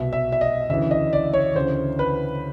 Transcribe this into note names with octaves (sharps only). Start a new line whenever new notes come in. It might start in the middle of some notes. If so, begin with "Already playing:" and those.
Already playing: C2 B2 E5
E5
E5
D#5
D2 C#3 E3 E5
D#5
D5
C#5
D2 C#3 E3 C5
B4